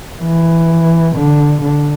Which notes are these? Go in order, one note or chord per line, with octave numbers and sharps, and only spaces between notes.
E3
D3
D3